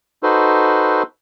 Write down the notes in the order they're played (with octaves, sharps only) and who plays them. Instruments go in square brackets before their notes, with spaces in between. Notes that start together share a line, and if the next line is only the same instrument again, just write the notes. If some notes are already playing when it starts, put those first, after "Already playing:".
[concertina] D#4 F#4 A4 B4 C5